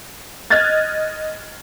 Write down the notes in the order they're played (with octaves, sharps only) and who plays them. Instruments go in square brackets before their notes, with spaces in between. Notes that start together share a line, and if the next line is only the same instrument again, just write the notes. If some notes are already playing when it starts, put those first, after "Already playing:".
[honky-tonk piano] D#5 F6 F#6 G#6 A6